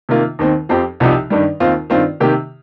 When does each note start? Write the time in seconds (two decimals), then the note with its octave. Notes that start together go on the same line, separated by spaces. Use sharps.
0.09 C3 D#3 A#3 F4
0.39 D#2 D#3 C4
0.69 F2 F3 C4 G4
1.00 C2 C3 F3 D#4 G4
1.30 G2 D#3 G3
1.60 D#2 D#3 C4 F4
1.90 G2 D#3 C4 F4
2.20 C3 D#3 A#3 G4